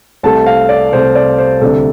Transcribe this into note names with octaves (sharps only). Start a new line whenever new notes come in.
C2 C3 A3 A5
F5
D5
C2 C3 A3 C5
D5
C5
D2 C3 G3 D4 A4